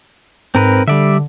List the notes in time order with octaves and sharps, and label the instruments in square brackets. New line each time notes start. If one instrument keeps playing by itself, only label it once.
[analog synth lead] G#2 [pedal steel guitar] C4 A#4 B4
[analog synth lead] D3 [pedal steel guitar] G3 D5 E5